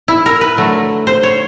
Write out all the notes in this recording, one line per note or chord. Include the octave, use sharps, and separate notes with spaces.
E4
A#4
B4
D3 F#3 A3
C5
C#5